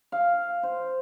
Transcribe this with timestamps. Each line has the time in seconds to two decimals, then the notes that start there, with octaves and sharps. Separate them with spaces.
0.12 F5
0.63 C5